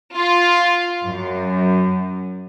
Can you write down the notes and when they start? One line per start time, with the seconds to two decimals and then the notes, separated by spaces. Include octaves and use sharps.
0.14 F4
1.03 F#2